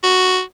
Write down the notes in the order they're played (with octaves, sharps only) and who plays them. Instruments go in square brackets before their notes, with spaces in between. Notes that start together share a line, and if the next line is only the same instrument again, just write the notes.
[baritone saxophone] F#4